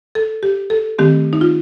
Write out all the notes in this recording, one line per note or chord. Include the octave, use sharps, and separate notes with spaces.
A4
G4
A4
D#3 A3 C4 G4
D#4
F4